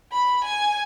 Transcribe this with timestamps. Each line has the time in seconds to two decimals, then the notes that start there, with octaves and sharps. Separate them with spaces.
0.12 B5
0.44 G#5